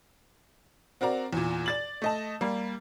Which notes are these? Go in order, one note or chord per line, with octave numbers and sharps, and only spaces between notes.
C4 F#4 A#4 D5 A#5
E2 A#2
D5 A6 F#7
A3 D#5 A5
G3 A#3